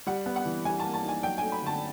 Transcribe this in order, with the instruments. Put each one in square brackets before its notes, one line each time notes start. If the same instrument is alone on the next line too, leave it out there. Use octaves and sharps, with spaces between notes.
[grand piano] G3 [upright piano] F#5
[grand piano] B3
[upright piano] F#5
[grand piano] E3
[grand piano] G3 [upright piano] G#5
[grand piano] A#3 [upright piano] A5
[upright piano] A5
[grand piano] D#4 [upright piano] G#5
[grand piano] F#3 [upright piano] G5
[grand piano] A3 [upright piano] G#5
[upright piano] B5
[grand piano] D3 [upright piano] A5